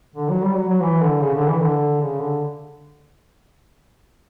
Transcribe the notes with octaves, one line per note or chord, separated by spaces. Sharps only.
D3
F#3
G3
F#3
F#3
E3
D3
C#3
D3
E3
D3
C#3
D3